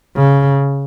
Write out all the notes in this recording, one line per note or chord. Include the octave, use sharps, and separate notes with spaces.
C#3